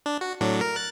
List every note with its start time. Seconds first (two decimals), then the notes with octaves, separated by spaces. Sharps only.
0.06 D4
0.21 F#4
0.41 A2 F#3 D4
0.61 A#4
0.76 F#6 A6